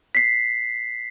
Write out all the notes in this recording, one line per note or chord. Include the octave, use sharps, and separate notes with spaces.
B6 C7